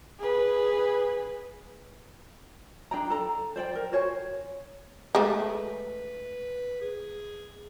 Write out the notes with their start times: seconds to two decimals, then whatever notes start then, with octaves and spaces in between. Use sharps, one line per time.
0.20 G#4 B4
2.91 D4 G#4 G5 A#5
3.10 A4 A#5
3.56 C5 D5 G5
3.75 A#4
3.92 F#4 C5 C#5 G#5
5.15 G#3 A3 B4
6.81 G#4